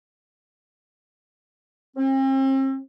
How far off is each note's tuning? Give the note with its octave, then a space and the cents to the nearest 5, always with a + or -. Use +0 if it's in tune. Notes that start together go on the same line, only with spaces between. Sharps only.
C4 +40